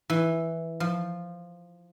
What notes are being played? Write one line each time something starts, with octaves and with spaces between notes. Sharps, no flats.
E3
F3